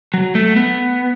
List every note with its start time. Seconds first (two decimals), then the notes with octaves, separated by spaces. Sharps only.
0.14 F#3
0.35 A3
0.56 B3